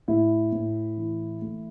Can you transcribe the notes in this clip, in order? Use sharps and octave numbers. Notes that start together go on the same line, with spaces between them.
A2 E4
A2
E3
A3